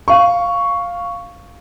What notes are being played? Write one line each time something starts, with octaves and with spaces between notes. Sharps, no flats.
F5 C#6